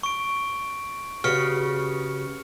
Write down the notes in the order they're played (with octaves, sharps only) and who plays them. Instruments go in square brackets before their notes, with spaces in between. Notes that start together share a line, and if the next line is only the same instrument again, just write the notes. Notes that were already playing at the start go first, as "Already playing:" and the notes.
[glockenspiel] C#6 D7
[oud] C#3 [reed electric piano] F#4 G4 B4 [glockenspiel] F6 C#7